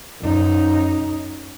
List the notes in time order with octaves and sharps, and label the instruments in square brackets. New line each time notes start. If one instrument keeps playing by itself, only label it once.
[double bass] F#2 D#4